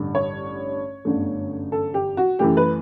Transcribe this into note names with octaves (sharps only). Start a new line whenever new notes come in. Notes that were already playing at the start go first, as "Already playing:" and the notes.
Already playing: A1 G2 D3
C#5
G1 F#2 D3 A3
A4
G4
F#4
F#2 E3 A3 G4
B4